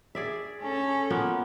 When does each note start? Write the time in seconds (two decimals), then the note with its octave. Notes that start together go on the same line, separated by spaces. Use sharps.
0.15 G#4 D5 E5
0.61 C#4 A4
1.10 F3 A#3 B3